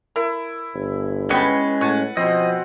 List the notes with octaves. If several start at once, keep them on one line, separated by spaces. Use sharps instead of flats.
E4 A#4
G1
G#3 B3 C#4 B4 G5 A5 B5 C#6
A2 C#5 F#5 G#5 A5
B2 F3 C4 D#5